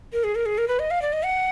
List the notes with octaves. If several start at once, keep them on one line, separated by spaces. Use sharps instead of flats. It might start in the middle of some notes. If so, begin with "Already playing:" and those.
A#4
G#4
A#4
G#4
A#4
B4
D#5
F5
D5
D#5
F#5